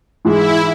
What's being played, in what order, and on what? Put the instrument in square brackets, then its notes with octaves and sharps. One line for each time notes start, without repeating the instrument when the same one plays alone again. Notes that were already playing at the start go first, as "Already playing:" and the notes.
[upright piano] G#2 E3 G#3 [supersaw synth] E4